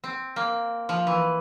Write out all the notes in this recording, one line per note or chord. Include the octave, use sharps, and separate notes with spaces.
C4
A#3
F3
E3